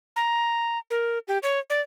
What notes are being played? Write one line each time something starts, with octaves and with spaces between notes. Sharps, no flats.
A#5
A#4
G4
C#5
D5